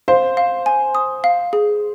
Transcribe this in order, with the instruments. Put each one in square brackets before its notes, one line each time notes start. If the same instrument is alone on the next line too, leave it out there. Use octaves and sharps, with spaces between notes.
[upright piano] C5 [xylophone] F5
[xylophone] F5
G#5
D#6
F5
G#4